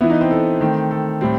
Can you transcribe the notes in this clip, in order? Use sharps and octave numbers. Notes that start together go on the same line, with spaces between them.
E3 B3 E4 E5
D#4 D#5
C4 C5
A4
D#3 A3 C4
A4
A2 G3 C4